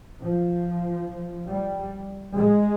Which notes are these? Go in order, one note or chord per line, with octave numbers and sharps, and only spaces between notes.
F3
G3
G#3